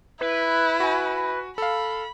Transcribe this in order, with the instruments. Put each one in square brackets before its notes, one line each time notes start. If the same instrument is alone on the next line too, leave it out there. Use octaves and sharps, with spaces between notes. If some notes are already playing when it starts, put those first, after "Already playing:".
[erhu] E4 [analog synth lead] B4
[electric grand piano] F#4 G#5
[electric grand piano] A4 F5 [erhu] B5